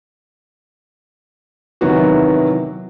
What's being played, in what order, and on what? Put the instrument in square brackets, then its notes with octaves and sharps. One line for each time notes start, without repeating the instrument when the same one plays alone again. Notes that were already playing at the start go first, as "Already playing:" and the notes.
[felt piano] C3 D#3 E3 F#3 B3 F#4